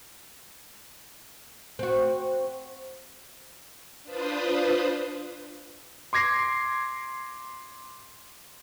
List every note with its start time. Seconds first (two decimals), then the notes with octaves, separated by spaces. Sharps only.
1.79 C4 F#4
4.04 D4 F4 B4 C5 D#6
6.13 C6 D6 G#6 A#6 C7